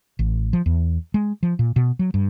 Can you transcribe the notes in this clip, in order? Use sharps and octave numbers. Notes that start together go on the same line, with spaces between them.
A1
F3
E2
G#3
F3
A#2
B2
F#3
G2